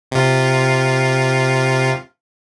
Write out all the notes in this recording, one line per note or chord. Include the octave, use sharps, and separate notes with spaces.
C3 F4